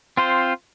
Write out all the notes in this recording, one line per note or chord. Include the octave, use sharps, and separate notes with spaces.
C4 F4 C5